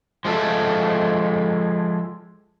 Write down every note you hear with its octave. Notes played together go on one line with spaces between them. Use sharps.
F3 G#3 A3 A4 E5